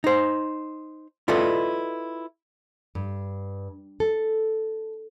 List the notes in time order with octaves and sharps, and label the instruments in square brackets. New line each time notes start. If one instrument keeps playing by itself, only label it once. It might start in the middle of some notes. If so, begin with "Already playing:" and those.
[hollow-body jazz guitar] D#4 C5
E4 F4 A4 B4 D5 D#5
[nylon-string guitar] G2
A4